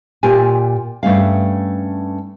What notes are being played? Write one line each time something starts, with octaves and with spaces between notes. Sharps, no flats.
A#2 F4 G4 G#5
G2 A3 C#4 F5